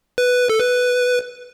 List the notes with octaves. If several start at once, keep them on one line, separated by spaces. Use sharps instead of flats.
B4
A4
B4